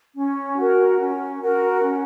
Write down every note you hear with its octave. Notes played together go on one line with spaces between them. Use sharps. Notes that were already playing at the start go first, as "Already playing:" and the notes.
C#4
F#4 A#4
C#4
F#4 A#4
C#4